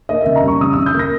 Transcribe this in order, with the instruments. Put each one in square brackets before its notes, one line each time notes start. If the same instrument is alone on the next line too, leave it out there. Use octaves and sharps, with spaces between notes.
[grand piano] A#3 D#5
C#3 E5
A#5
G3 C#6
C#3 D#6
C#3 E6
G6
A#3
A#6